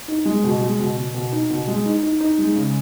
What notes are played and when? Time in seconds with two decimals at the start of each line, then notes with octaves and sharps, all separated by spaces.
0.08 D#4
0.26 G#3
0.44 B2
0.61 G#3
0.79 B2
0.96 B2
1.14 B2
1.32 D#4
1.50 B2
1.68 G#3
1.85 D#4
2.03 D#4
2.20 D#4
2.39 G#3
2.55 C#3